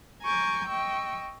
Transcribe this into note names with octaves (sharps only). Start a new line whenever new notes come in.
G#5 A#5 C#6 D6 G6
D#5 G5 C#6 E6